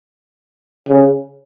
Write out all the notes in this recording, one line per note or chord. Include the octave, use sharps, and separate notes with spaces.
C#3